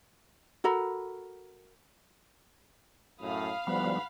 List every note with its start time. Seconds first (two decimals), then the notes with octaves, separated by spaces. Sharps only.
0.64 F#4 A4 A#4 B5
3.21 F#2 A2 F5 B5 D#6
3.67 D2 G#2 F3 G3 B3 B4 F#5 B5